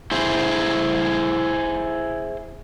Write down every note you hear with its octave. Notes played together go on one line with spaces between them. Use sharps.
E4 G#4 C5